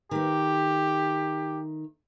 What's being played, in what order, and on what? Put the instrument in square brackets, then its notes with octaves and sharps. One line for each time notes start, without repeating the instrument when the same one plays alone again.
[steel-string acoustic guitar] D#3 A3 [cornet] G4